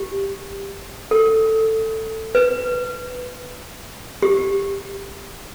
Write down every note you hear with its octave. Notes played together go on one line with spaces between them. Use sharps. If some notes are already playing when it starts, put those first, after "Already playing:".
Already playing: G4
A4
B4
G4